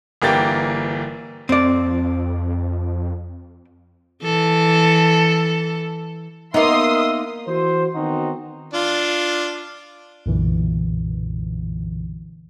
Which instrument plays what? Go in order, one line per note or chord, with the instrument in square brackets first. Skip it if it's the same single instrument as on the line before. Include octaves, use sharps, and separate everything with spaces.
[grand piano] G1 E3 A#3 G4 G5 A6
[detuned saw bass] F2 [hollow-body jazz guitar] C4 D5
[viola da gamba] E3 A4
[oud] A#3 B3 [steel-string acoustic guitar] D#4 [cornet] E5 [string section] C6 D#6
[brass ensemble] E3 F#4 C5
D#3 B3 C4 D#4 F#4
[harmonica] D4 F4
[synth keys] B1 F#2 A#2 D3 E3